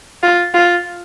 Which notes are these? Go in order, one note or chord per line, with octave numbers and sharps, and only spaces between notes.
F4
F4